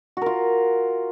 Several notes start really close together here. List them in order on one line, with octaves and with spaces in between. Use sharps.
F#4 A#4 F4